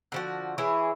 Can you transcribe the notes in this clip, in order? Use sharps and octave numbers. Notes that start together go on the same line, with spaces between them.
D3 F3 F#4
E3 E4 G#4 C#5